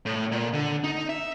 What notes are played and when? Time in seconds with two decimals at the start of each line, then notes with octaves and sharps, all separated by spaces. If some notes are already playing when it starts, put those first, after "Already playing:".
0.06 A2
0.32 A#2
0.53 D3
0.84 D#4
1.09 E5